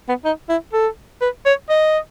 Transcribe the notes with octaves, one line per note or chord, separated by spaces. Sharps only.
B3
D#4
E4
A4
B4
C#5
D#5